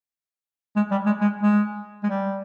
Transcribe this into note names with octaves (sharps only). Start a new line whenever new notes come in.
G#3
G3
G#3
G#3
G#3
G#3
G3